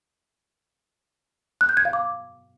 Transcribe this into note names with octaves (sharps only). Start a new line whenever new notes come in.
F#6
G6
G#6
F5
D6